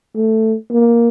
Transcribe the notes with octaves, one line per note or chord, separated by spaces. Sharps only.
A3
A#3